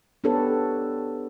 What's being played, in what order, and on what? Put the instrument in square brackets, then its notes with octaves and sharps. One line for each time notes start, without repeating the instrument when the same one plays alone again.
[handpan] B3 D4 G4 A4 B4 C#5